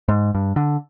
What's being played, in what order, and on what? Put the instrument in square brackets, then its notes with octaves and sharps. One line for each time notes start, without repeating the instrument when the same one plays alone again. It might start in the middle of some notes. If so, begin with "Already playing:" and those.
[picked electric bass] G#2
G2
D3